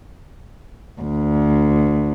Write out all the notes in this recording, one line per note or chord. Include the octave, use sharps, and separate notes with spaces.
D2